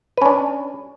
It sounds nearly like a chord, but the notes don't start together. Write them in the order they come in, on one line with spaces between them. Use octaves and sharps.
B4 C#4 D4